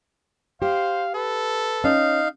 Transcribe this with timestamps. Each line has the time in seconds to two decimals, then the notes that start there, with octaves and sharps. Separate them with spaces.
0.62 G4 C5 F5
1.15 A4 B4
1.84 C#4 D#4 F5